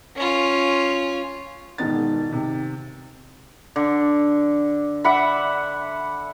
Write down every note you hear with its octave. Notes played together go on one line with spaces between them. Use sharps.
C#4 F4
E1 G#2 D#3 B3 A6
C3 D#3
D3
D5 E5 F#5 B5